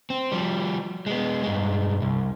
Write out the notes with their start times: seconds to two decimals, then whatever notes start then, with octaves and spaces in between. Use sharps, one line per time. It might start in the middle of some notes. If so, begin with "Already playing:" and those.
0.10 C4
0.32 F3 G3
1.06 G#3 B3
1.43 G2 G#3
2.02 C2